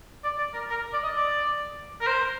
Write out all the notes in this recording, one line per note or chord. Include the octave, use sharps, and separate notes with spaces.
D5
D5
A#4
A#4
D5
D#5
D5
A#4
C5